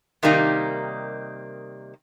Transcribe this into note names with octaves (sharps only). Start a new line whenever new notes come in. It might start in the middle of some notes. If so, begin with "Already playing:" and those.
C3 D#3 G3 A#3 D#4 G4